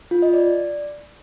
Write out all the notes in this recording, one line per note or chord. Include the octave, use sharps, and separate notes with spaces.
F4
D#5
D5